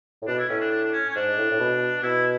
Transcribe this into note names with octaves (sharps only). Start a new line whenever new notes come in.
A2
B2 D4
E4
A2 C#4
D4
D4
D4
C#4
C#4
G#2 D4
A2
A2
B2
B2 E4